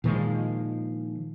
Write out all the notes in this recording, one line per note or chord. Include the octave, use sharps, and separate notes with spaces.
A#2 D#3 F3 G#3